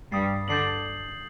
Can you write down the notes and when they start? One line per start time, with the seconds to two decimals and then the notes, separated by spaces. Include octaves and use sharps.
0.11 G2 G3 D#6 A6 C7
0.48 D3 D4 G6 C7 F#7